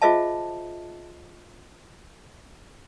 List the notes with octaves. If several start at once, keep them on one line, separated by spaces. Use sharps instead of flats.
F4 G#4 C5 D#5 E5 A5